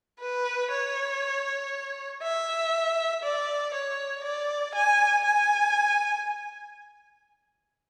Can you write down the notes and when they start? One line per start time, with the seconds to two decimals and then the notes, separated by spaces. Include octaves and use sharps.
0.20 B4
0.71 C#5
2.23 E5
3.23 D5
3.74 C#5
4.24 D5
4.75 G#5
5.25 G#5